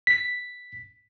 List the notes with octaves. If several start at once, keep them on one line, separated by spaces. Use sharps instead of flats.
B6